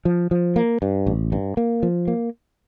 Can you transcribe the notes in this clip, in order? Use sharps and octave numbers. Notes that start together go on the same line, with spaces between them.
F3
F3
A#3
G2
A1
G2
A#3
F3
A#3